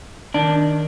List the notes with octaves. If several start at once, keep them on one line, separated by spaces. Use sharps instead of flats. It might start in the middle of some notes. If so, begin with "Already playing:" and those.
D#3 D4